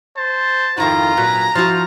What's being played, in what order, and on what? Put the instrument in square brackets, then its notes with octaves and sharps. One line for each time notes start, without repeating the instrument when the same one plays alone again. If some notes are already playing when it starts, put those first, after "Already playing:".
[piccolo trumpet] C5 [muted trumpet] A5
[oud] F2 D#3 E4 [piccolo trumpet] F4 [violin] A#5
[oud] A#2 F#3 [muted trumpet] B4
[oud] F3 E4 F#4 [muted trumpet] A5 [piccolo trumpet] F6